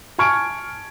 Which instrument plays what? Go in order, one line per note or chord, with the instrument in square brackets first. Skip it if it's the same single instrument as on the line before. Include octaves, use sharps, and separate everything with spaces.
[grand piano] G#5 A5 C#6 F6 G#6 D7